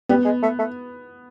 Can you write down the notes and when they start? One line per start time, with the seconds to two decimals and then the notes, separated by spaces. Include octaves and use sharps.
0.09 G3 B3
0.25 G#3
0.42 A3
0.59 A3